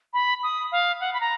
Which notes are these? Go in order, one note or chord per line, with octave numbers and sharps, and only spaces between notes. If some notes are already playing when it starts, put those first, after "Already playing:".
B5
D#6
F5
F#5
B5
A#5